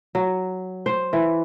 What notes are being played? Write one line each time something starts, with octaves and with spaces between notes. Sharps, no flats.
F#3
C5
E3